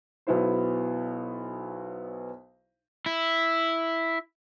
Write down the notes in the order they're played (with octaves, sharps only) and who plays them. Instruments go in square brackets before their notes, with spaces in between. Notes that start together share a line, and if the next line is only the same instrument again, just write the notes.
[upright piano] B1 F#3 B3 E4 C5
[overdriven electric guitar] E4